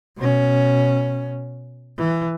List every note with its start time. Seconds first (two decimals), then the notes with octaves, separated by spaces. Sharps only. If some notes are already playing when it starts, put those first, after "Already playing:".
0.17 B2 C#4
1.98 E3